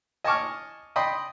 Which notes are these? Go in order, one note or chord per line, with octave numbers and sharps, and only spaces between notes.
D#5 G#5 A5 C#6 D6 F6
D5 D#5 G5 B5 C6 D#6